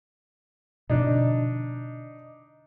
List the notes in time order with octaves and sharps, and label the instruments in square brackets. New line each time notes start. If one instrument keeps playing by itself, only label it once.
[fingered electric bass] B2 D3 F3 [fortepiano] D4 D#4